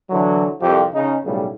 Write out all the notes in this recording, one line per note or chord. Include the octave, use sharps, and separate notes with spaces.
D3 E3 F#3
C2 F2 F3 G4
C#3 D#4
B1 A2 C#3 G3